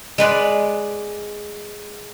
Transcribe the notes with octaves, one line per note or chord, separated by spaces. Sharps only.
G#3 B4 D5